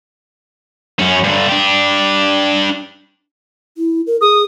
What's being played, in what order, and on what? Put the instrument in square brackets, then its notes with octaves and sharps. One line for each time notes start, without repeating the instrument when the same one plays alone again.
[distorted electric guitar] F#2 C#4
G2 D3
D4 G4
[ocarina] E4
A#4
[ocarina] G#4 [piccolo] D#6